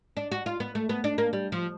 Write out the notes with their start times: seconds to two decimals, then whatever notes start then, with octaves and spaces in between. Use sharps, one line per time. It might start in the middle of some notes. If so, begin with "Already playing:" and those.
0.17 D4
0.32 F#4
0.46 F4
0.60 B3
0.75 A3
0.89 B3
1.04 D4
1.18 A#3
1.33 G3
1.52 F3